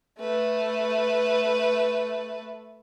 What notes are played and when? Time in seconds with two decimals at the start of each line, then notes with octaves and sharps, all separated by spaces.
0.20 A3 B4